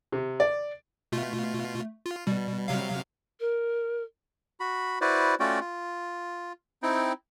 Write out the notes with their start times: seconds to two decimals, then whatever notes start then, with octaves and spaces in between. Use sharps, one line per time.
0.12 C3
0.40 D5
1.12 B2 A3 F4
2.06 F4
2.27 B2 G3
2.68 C3 F#3 F5
3.40 A#4
4.60 F#4 B5
5.01 E4 F#4 B4 C5 D5
5.40 A3 C#4 F4 F#4 D5 G5
5.60 F4
6.83 C4 D#4 E4 G5